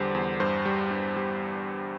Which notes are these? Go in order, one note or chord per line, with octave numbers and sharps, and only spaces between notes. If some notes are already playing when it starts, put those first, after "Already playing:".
Already playing: E2 D3 G3 C5
E2
G2 C5
G3
G2
G3